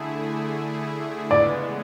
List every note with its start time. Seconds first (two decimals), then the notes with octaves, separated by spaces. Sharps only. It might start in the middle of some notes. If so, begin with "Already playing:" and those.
Already playing: D3 A3 E4 G#4
1.31 C#3 E3 G#3 B3 D5